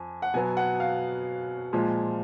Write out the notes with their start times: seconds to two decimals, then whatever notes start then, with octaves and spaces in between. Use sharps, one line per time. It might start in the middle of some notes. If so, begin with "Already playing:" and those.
Already playing: F2 G#5
0.22 F#5
0.34 B2 F#3 B3 G#5
0.57 F#5
0.80 F5
1.73 A#2 F3 G#3